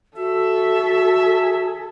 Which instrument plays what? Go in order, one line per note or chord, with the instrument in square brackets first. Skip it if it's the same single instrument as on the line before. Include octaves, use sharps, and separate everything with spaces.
[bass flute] F#4 [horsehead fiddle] A4 [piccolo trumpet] E5